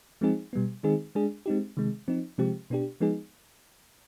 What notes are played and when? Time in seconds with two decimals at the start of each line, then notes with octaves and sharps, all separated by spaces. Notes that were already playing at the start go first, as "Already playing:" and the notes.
0.21 F3 G#3 C4 D#4 G#4
0.53 B2 G3 B3
0.83 D#3 G#3 C4 D#4 G#4
1.15 G#3 D4 G#4
1.46 G#3 C4 D#4 G4
1.77 C3 D#3 G#3
2.08 F3 C4 D#4
2.38 C3 F3 G#3 C4 G4
2.70 B2 B3 D4 G4
3.00 F3 G#3 B3 D#4 G#4